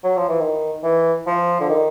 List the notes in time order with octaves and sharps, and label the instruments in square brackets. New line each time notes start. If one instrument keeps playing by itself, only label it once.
[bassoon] F#3
F3
E3
D#3
E3
F3
D3
D#3